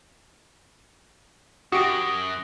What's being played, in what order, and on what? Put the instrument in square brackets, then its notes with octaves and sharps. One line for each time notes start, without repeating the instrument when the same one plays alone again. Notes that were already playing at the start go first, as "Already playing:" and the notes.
[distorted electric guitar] F#2 [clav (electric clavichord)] F#4 G4 [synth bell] D#6 A#6 D7